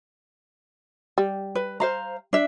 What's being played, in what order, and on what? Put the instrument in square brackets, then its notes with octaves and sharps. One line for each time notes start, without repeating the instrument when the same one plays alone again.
[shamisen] G3
[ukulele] B4
C5 F5 A#5
D4 E5